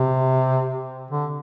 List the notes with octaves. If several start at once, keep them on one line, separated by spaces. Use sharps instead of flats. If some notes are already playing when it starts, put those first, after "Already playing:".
Already playing: C3
D3